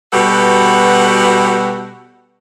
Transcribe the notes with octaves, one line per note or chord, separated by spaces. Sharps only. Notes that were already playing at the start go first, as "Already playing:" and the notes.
B2 G3 F#4 A4 B4 F#5